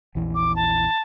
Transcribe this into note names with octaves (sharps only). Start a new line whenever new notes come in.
A#1 E2 E3
D6
A5